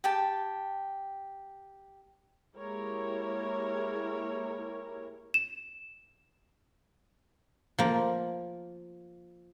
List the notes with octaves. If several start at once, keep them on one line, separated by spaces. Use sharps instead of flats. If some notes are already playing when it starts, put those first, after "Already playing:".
G4 G5 A5
G#3 A#3 E4 G4 A#4 C#5
E7
F3 A#3